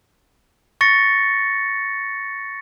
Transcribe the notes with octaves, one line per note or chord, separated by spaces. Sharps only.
C#6 A6 A#6 C#7